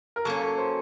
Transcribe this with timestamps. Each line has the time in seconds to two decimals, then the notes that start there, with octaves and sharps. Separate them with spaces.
0.16 A#4
0.25 F#3 A#3 C#4 A4
0.41 A4
0.58 C5